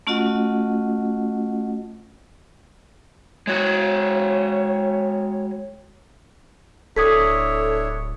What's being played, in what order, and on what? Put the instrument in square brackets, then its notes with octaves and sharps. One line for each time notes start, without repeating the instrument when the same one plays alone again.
[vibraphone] A3 C#4 F4 F#4 D#5 F#5
[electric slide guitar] G#3 F#4 [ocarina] C#5
[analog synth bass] D1 [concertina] D4 E4 C#5 [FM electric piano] A4 [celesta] D#6 G#6 B6